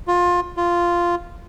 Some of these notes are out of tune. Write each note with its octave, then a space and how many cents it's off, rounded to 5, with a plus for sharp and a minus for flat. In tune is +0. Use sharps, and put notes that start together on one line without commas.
F4 +20
F4 -5